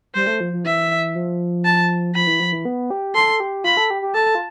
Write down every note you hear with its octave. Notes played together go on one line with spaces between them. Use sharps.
G3 C5
A3
F3
F3
E3 E5
F3
A5
F3 B5
E3
F3
E3
B3
G4
A4 C6
G4
F4 B5
A4
G4
G4
A4 A5
F4